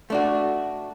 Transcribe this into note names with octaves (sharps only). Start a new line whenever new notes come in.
A3 D4 F#4